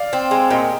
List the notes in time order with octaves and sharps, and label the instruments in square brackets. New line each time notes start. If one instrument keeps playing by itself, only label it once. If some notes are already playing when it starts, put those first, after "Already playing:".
Already playing: [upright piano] D5 F5
[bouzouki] C4
G#3
[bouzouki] A#2 [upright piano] D#5 G5